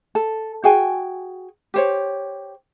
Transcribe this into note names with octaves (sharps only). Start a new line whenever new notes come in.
A4
F#4 G#4 G5 G#5
G4 C5 C#5